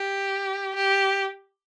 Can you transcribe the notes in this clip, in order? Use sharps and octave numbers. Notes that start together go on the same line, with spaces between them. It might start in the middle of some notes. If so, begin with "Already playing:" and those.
Already playing: G4
G4